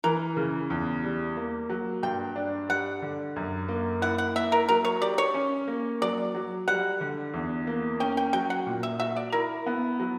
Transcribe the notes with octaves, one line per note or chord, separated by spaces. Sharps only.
E3 A#4
C#3
E2
G3
A#3
F#3
G2 G5
D4
G3 F#5
D3
F#2
A#3
E4 F#5
F#5
A#3 E5
A#4
F#3 A#4
C#5
G4 D5
C#5
C#4
A#3
F#3 D5
F#3
G3 F#5
D3
E2
A#3
C#4 G5
G5
F#3 G5
F#5
A#2
E5
F#4 E5
D5
E4 A#4
B3
F#3